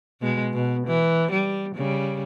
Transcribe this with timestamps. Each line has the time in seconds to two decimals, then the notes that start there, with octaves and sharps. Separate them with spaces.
0.21 B2 G#3
0.53 B2
0.87 E3
1.31 G3
1.75 C#3 G3